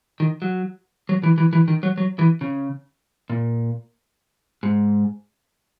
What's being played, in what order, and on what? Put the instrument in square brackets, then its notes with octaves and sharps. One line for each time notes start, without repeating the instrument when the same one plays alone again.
[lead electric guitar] D#3
F#3
F#3
E3
E3
E3
D#3
F#3
F#3
E3
C#3
A#2
G#2